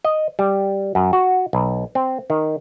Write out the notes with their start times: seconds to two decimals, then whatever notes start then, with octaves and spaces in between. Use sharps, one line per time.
0.05 D#5
0.39 G3
0.95 F#2
1.13 F#4
1.53 B1
1.95 C4
2.30 D#3